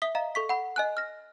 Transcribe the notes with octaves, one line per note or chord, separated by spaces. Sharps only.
E5 D#6 B6 G7
D#5 F5 A#5
A4 C#6 B6
F#5 B5
D#5 G#5 F#6
F6 A#6